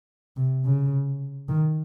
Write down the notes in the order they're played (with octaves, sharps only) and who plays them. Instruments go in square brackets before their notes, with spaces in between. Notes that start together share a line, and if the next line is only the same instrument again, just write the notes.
[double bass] C3
C#3
D#3